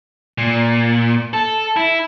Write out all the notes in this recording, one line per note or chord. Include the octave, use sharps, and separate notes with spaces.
A#2
A4
E4